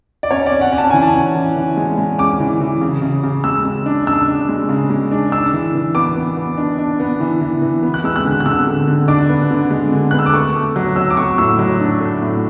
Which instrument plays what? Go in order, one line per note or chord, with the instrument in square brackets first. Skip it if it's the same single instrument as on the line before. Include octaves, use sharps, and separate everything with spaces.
[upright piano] D5
C#4 C#5
D5
C#4
F#5
C#4
A5
E3 G#5
A5
C#4
E3
E3
G#3
G#3
C#4 D6
E3
E3
C#3
C#3
C#3
G#3 E6
C#3
D4
D4 E6
D4
G#3
C#3
G#3
D4
D4 E6
E3
E3
B3 D6
B3
B3
D4
D4
B3
E3
E3
E3
B3
F#6
G#3 E6
F#6
D3
F#6
D3 E6
D3
D3
D4 D6
B3
D3
G#3
D3
B3 F#6
E6
D6
A3 C#6
A3
F#3
F#3 E6
D6
A3 C#6
A2 E6
F#3
D4
A3
A2